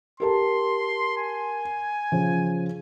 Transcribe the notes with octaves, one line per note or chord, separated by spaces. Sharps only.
G4 A#4 A5 C6
G#5
C#3 F3 C#4